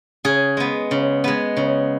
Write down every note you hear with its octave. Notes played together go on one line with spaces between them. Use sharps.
C#3 G#4
G#3 B3
C#3
G#3 B3
C#3